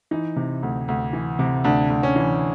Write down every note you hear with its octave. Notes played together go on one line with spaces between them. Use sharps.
E3 D#4
C3
D2
D2
E3
C3
D2 D4
D2
C#4
E3